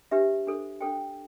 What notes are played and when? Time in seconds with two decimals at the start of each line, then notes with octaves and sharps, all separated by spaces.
0.11 D4 G4 B4 E5
0.47 D4 A4 C5
0.81 D4 A4 C5 G5